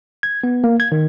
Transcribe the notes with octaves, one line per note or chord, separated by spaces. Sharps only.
G#6
B3
A#3
G#6
D#3